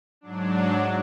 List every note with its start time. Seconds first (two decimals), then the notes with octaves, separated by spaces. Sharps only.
0.21 G#2 F#3 D4